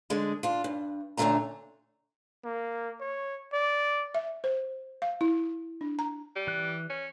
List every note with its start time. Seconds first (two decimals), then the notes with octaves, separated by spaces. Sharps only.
0.10 D3 G#3 D4
0.43 D4 F4
0.64 G2
1.17 F#2 A#2 D3 A3 D4 A#5
2.44 A#3
3.00 C#5
3.53 D5
4.15 E5
4.44 C5
5.02 F5
5.21 E4
5.81 D4
5.99 A#5
6.36 G3
6.47 E3 F#6
6.90 C#4